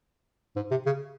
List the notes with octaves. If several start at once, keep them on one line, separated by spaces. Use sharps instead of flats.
G#2
C3
C#3